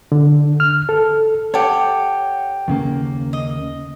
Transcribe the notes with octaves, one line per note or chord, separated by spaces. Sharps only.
D3
F6
A4
G4 A4 C#5 F#5
D#2 C#3 A#3
D#5